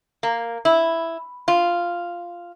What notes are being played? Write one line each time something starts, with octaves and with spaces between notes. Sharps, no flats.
A#3
E4
F4